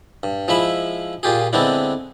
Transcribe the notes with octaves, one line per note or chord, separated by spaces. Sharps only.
G2
F3 G#3 E4 E5 B5
A#2 F4 G4 G#4
D3 G#3 B3 C4 D4 E4